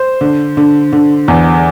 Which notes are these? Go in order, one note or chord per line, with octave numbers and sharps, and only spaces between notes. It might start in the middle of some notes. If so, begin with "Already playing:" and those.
Already playing: C5
D3
D3
D3
E2